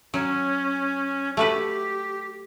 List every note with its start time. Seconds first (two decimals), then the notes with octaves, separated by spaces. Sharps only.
0.14 F#3 C#4
1.37 A3 F#4 G4 B4